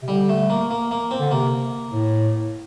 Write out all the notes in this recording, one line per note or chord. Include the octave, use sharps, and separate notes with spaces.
C3
D3 G3
A3
A#3
A#3
A#3
C4
D3
C3 A#3
A2